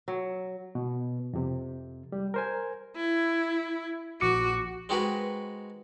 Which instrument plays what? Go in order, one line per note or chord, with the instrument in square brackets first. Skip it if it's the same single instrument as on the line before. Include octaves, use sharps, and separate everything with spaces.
[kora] F#3
[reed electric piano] B2
F2 C3
G3
A#4 C5 G#5
[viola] E4
[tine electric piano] A#1 D6 C#7 [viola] F#4
[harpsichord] G#3 C4 D#4 F#4 A#4 B4